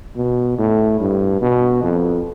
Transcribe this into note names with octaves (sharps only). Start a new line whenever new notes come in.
B2
A2
G2
B2
F2